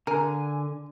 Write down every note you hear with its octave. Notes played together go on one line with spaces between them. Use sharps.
D3 A#4 G#5